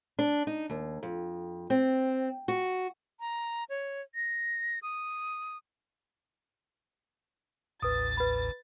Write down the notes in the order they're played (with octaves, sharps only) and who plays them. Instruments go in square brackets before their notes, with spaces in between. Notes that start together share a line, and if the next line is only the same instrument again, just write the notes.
[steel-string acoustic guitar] D4
D#4
D#2
F2
C4
F#4
[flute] A#5
C#5
A#6
D#6
[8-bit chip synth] A1 D#2 A2 [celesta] B4 D#6 [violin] A6
[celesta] B4 B5